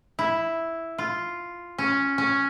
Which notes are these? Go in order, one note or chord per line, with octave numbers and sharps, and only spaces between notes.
E4
F4
C#4
C#4